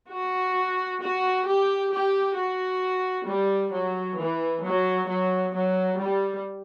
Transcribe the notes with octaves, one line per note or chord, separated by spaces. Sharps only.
F#4
F#4
G4
G4
F#4
G3
F#3
E3
F#3
F#3
F#3
G3